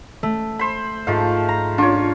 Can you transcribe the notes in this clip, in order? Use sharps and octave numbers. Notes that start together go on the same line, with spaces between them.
A3
C5 B5
G#2 F3 A3 F5
A#5
D4 F4 C#5